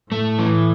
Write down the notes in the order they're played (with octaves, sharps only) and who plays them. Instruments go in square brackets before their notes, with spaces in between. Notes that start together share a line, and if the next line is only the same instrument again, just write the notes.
[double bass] A2 [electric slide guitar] A3
[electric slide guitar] E3